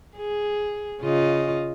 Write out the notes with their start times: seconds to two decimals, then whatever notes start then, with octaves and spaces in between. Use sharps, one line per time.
0.17 G#4
1.01 C#3 F4 D#5